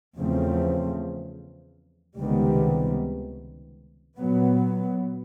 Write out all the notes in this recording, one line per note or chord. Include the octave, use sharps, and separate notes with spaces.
E2 C#3 F3 A3 C4
C#2 C3 D#3 G3 B3
A#2 F#3 B3